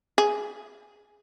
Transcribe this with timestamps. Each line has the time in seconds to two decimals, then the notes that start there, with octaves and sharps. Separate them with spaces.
0.18 G#4